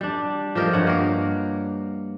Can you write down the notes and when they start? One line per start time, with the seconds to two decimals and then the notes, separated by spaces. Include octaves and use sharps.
0.01 G3 D4
0.55 F3 G4 A#4 D#5
0.73 G2 C#5 F#5
0.87 A#3 A#4